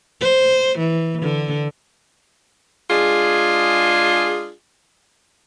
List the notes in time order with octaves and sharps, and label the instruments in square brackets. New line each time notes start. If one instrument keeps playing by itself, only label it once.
[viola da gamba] C5
E3
D3
[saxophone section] G#3 D4 F4 G#4